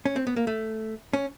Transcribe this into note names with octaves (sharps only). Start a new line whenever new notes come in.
C#4
C4
B3
A#3
A3
C#4